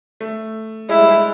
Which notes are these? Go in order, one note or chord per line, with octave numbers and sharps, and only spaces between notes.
A3
G#3 E4
G3
G#3